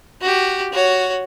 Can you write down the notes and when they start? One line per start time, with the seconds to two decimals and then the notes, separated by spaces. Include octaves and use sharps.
0.22 F#4 G4
0.73 F#4 C#5